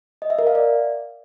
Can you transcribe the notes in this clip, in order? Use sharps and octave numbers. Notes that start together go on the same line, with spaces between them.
D#5
E5
A#4
F5
D5